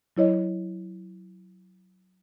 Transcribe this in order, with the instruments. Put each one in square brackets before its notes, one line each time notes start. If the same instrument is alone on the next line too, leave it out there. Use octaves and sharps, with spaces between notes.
[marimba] F#3 E4 C#5 D#5